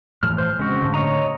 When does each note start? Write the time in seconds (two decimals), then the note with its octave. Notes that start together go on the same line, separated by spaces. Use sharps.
0.23 A2 E3 F3 F6
0.38 C5
0.59 C#3 G#3 C4 F#4
0.82 A2 D3
0.94 C#5 D#5 A#5